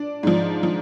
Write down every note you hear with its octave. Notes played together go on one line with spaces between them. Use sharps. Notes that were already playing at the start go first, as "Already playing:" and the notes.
Already playing: D4
G#2 F3
F3